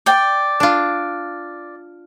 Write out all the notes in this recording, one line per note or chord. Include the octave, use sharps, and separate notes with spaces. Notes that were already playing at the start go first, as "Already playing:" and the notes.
D5 G5
D4 F4